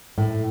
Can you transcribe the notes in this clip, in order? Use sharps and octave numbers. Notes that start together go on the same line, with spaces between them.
A2